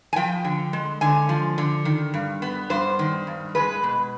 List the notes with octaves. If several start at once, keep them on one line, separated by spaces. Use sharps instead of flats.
G#5
F3 G5
D3
G#3
D3 G#5
F3
D3
D#3
G2
B3
G2 C5
D#3
G2
G#3 B4
B2